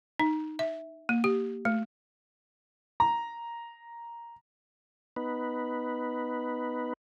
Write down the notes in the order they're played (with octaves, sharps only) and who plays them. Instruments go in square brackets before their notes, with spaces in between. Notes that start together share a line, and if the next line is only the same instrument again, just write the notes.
[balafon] D#4
E5
A#3
G4
A3
[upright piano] A#5
[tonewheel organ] B3 D#4 B4